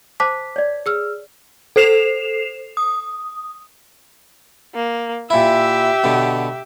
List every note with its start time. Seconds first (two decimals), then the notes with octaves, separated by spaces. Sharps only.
0.20 C5 A5 D6 B6
0.56 C#5 D5
0.86 G#4 E6 F6
1.76 A4 C5 C7 E7 F7
2.77 D#6
4.75 A#3
5.30 A#2 E4 G4 E5
6.04 B2 D3